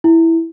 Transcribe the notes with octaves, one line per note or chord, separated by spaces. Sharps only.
E4